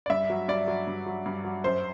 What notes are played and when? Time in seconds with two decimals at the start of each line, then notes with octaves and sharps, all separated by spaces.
0.06 D5
0.10 G2 E5
0.30 F#3
0.48 G2 D5
0.68 F#3
0.87 G2
1.06 F#3
1.26 G2
1.45 F#3
1.64 F#2 C5